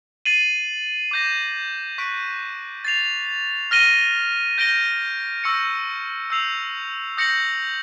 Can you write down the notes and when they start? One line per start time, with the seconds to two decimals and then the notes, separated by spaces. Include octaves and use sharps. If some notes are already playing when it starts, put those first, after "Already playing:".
0.25 A6 C7 D#7 F#7
1.11 D6 G6 A#6
1.98 C#6 F#6 B6 D7
2.85 A6 C7 F7
3.71 F6 A#6 D#7 G7
4.58 G6 A#6 D7 G7
5.44 C#6 E6 G6 A#6 C#7
6.30 E6 G6 C7 F7
7.17 D#6 G6 A#6 C#7 F#7